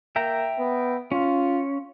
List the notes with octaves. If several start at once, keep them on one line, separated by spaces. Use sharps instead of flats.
A#3 E5 G5 A#5
B3
C#4 F4